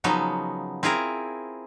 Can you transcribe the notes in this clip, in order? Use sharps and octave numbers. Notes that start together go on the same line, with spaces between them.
C#3 F3 F#3 B3 D#4
C4 E4 F4 G#4 A#4